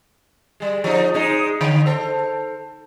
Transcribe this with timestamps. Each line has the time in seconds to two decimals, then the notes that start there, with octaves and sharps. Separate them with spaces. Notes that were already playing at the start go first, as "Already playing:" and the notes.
0.60 G3 G#3
0.84 F3 D#4
1.14 G#3 D#4
1.61 D3
1.86 A4 C5